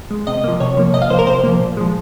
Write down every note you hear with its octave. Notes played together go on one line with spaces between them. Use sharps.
G#3
C3 D#5
F3 A#3
C3 C#5
F3 A#3
C3 D#5
F5
F3 A#3 C5
A#4
C3 C5
F3 A#3
A#2
F3 G#3